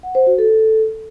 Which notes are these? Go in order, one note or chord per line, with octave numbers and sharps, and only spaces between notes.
F#5
C5
F#4
A4